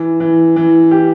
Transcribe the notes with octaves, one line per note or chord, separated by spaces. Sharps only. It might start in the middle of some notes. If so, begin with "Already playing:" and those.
Already playing: E3
E3
E3
G4